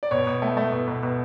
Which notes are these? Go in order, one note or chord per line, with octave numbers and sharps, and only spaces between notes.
D5
B2 C#5
B2
A3
A3
B2
B2
B2